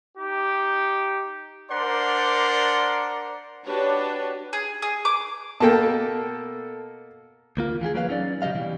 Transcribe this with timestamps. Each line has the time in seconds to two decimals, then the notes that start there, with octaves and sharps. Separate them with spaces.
0.17 D#4 G4
1.70 D4 A#4 C5 D5 F#5 C6
3.64 D4 F#4 G4 B4 C#5
4.53 G#4
4.82 G#4
5.05 D6
5.60 B2 A#3 A4 G5 A5
7.57 D2 A#3 F4
7.81 E3 F4 G4 G#4
7.94 F#3 A#3 B3 B4 E5 F5
8.09 F#3 C#4 D#4 D5
8.42 C#3 F#3 G3 D#5 F5
8.55 B2 E3 G3